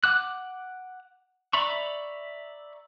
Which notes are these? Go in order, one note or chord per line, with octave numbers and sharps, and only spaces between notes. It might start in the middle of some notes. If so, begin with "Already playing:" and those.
F#5 D6 F#6
D5 E5 A#5 B5 C#6